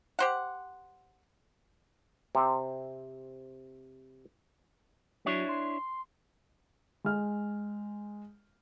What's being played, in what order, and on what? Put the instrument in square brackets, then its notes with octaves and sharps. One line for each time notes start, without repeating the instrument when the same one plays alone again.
[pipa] G4 C5 F#5
[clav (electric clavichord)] C3 C4
[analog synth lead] F#3 [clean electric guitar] D4 E4 C#5
[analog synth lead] C6
[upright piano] G#3 F6